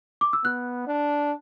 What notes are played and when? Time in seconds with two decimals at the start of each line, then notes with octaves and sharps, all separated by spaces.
0.21 D6
0.33 E6
0.45 B3 F#6
0.87 D4